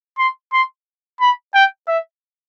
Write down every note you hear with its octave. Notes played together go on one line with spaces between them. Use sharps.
C6
C6
B5
G5
E5